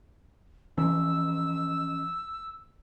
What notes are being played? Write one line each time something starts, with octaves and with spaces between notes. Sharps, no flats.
E3 F3 C#4 E6